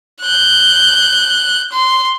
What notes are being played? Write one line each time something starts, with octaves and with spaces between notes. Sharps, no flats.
F#6 G6
C6